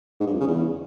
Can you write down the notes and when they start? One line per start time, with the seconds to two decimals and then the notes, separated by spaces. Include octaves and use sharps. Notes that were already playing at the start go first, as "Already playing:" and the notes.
0.20 G#2
0.27 G2
0.34 F2
0.41 C#3
0.47 E2